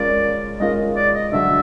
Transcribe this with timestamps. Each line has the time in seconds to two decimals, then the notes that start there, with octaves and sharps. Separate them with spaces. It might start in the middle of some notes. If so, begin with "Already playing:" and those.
Already playing: G#3 C#4 F4 A#4 D5
0.60 G#3 C#4 F4 A#4 D#5
0.96 D5
1.14 D#5
1.32 G2 D3 F#3 E5